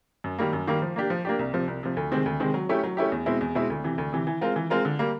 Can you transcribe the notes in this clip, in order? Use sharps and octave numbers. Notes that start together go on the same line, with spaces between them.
F#2
D#3 G3 A#3
F#2
D#3 G3 A#3
F3
A#3 D4 G4
F3
A#3 D4 G4
C2
C3 F3
C2
C3 F3
D2
C3 D#3 G#3 C4
D2
C3 D#3 G#3 C4
F#3
A3 C#4 E4 G4
F#3
A3 C#4 E4 G4
E2
B2 G#3 C4 E4
E2
B2 G#3 C4 E4
D2
C3 E3
D2
C3 E3
E3
G#3 C4 F4 A#4
E3
G#3 C4 F4 A#4
D3
G3 A#3